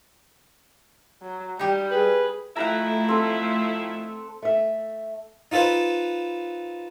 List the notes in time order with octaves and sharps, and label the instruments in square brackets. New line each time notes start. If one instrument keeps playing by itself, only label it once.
[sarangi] F#3
[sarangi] G3 [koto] D#4 G4
[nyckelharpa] G#4 [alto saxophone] B4
[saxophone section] D#3 F3 E4 [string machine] A3 [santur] F#5 G5 A#5
[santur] C4 A4
[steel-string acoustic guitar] A3 E5
[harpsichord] D#4 F4 A4 B4 C5